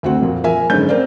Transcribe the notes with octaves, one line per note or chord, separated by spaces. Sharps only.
D2 C4 F#4 F#5
F2 A#2
F3 A#4 E5 G#5
F#1 G#2 D3 C#4 C5 G6
A#3 C4 A#4 C5 D5